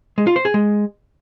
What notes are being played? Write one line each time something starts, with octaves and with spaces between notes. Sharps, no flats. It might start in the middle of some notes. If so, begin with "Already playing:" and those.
G#3
F4
C5
G#4
G#3